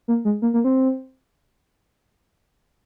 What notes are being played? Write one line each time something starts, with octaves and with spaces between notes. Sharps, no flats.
A#3
G#3
A#3
A#3
C4